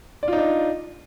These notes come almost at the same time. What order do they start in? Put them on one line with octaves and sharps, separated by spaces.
D5 F4 D#4 D4